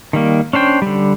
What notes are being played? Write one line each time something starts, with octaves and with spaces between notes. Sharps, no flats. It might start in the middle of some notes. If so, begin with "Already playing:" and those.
D#3 G3 A#3
C#4 D4 C5 G5
D3 G3